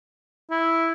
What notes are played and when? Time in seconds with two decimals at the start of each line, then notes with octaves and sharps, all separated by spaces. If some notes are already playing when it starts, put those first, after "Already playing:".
0.51 E4